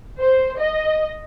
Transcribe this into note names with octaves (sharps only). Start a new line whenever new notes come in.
C5
D#5